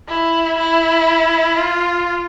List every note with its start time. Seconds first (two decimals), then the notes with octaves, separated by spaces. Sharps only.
0.09 E4
0.58 E4
1.57 F4